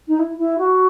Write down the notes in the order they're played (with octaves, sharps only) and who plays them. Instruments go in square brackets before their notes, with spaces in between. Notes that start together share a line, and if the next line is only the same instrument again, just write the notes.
[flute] D#4
E4
E4
F#4